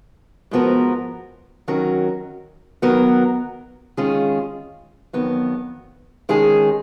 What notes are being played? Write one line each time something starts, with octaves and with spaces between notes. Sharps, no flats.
G#2 F3 B3 F#4 A#4
D#3 F#3 C#4 F#4 A#4
D#3 F#3 B3 F#4 A#4
D#3 G#3 C#4 F4 G#4
F2 D#3 F#3 B3
D#3 G#3 C#4 G#4